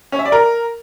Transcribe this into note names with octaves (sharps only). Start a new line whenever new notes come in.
C#4
E5
D5
A#4